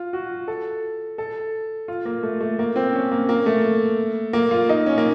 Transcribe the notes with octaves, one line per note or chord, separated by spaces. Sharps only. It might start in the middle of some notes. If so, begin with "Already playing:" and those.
Already playing: F4
F#4
A4
A4
F4
A#3
A3
A3
A#3
C4
C#4
A#3
A#3
A3
A#3
F4
D#4
C#4
A#3